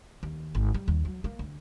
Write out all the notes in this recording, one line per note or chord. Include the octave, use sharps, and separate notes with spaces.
D#2
G#1
G3
D#2
F#3
A#3
D2